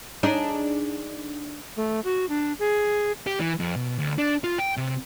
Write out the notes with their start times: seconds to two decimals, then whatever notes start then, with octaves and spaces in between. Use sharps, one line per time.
0.23 D4 D#4 G#4
1.77 A3
2.04 F#4
2.29 D4
2.59 G#4
3.27 G4
3.40 E3
3.60 F2
3.76 B2
3.99 D2
4.18 D4
4.44 F4
4.58 G5
4.77 C3